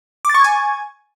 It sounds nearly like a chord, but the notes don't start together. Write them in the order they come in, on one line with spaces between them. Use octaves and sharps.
D6 A6 C#6 G#6 G#5